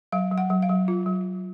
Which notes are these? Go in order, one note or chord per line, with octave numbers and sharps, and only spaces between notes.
F#3 F5
F#3
F#5
F#3
F5
F#3
F4
F#3